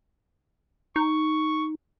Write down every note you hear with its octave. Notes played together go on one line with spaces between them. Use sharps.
D#4 C#6